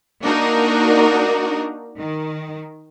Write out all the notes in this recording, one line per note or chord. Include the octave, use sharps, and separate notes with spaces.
A#3 D4 D#4 F#4 A#4
D#3